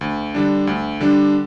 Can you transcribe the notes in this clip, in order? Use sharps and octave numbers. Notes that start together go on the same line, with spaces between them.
D2
D3 G3 D4
D2
D3 G3 D4